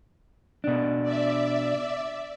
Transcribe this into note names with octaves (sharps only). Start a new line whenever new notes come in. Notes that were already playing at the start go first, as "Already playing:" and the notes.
B2 D4
D5 E5